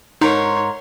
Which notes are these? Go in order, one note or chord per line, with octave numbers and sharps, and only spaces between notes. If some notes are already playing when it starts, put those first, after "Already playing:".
G#2 D#4 A#4 C#5 C6